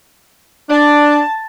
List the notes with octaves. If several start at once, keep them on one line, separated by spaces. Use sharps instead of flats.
D4 A5